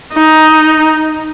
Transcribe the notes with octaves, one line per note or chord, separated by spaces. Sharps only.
D#4